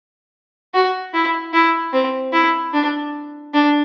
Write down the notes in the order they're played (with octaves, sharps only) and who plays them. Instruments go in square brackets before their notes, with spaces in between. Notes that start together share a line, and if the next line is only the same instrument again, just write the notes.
[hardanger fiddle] F#4
E4
E4
C4
E4
D4
D4